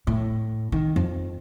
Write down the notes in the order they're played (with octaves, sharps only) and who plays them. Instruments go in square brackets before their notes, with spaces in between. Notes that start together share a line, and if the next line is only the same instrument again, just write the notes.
[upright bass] A2
D#3
F2